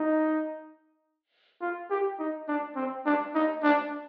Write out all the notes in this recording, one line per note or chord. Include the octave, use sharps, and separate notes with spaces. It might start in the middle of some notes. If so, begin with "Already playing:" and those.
Already playing: D#4
F4
G4
D#4
D4
C4
D4
D#4
D4